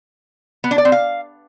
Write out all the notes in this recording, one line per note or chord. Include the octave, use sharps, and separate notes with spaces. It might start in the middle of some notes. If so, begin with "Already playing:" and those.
B3
D4
D5
C4
F5